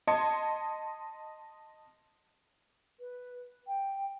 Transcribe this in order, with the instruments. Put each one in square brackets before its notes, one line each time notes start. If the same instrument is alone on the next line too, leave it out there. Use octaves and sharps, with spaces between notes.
[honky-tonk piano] D#5 A5 C6 G#6 C#7
[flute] B4
G5